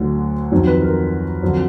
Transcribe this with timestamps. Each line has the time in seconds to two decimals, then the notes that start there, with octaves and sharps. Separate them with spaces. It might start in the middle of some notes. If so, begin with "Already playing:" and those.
Already playing: D2 D3 F#3
0.52 F2 D#3 F#3
0.67 B4
0.82 A#4
1.43 F2 D3 F#3